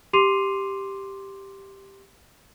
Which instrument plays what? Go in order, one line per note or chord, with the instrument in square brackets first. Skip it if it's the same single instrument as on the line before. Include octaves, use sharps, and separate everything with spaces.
[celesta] G4 C6 D6 C7 D#7 F7